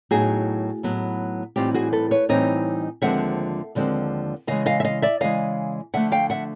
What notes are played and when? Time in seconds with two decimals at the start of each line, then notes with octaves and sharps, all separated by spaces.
0.11 A2 F#3 B3 D#4 F#4 G#4
0.83 A2 F#3 B3 D#4
1.56 A2 E3 G3 C4 D#4 F4 G4
1.74 F#4 G#4
1.93 A4 B4
2.11 B4 C#5
2.29 A2 E3 G3 C4 D#4 C#5 D#5
3.02 D#2 D3 F3 G#3 C4 E5 F#5
3.75 D#2 D3 F3 G#3 C4
4.47 C#3 E3 G#3 D#5 F5
4.66 D#5 F5
4.80 E5
4.84 D#5 F5
5.02 D5 E5
5.20 C#3 E3 G#3 D#5 F5
5.94 D3 F3 A3 E5 F#5
6.12 F5 G5
6.30 E5 F#5